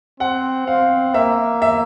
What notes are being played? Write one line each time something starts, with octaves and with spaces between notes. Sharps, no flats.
C4 F#5
C4 F5
A#3 E5
E5